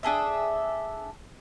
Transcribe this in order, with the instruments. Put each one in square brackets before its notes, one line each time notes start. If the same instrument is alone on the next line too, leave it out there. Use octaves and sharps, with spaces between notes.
[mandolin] D4 G#4 A4 E5